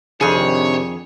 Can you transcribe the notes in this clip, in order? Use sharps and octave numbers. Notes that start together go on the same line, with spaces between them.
F2 C3 D#3 D4 G#4 C#5